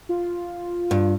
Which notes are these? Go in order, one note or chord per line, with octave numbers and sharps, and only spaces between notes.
F4
G2